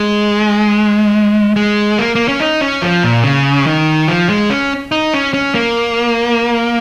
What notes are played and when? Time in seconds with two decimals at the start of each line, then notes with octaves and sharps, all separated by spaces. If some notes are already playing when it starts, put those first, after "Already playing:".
Already playing: G#3
1.56 G#3
1.98 A#3
2.15 A#3
2.28 C#4
2.40 D#4
2.61 C#4
2.82 F3
3.03 A#2
3.24 C#3
3.67 D#3
4.08 F3
4.30 G#3
4.50 C#4
4.92 D#4
5.14 C#4
5.34 C#4
5.55 A#3